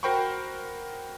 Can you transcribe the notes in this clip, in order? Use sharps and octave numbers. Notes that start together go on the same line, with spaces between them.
F#4 A#4 C5 G5 B5 C#6